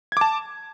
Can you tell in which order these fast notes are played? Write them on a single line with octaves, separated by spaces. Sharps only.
G#6 D6 A5